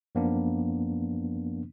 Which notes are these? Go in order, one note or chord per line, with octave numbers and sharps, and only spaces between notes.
F#2 F3 A#3 B3 D4